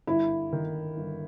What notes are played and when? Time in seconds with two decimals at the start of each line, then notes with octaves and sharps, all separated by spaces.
0.07 G1 E4
0.52 D#3
0.97 G1